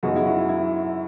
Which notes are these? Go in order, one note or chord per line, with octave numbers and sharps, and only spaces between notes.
F#2 C#3 F#3 G#3 B3 D#4 F#4
E4
F#3 F#4
E4